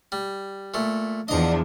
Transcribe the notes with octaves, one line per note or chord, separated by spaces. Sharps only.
G3
A#2 A3
E2 F3 D4 D#5 A#5